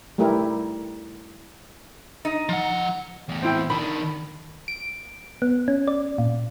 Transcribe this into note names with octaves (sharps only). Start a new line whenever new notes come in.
G3 A3 D#4 E4 G4 A#4
D#4
F3 F#5
E2 A2
C4 E4 G5
D#3 D4 B5
D7
B3
C#4
D5
A#2